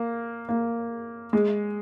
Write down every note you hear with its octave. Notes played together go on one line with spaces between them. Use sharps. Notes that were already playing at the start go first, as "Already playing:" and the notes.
Already playing: A#3
A#3
G#3